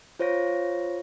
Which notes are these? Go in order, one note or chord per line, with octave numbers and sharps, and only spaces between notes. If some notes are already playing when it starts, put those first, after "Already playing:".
F4 C5 C#5 F5 A#6